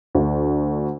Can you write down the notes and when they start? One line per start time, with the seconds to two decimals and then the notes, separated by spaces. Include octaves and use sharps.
0.15 D2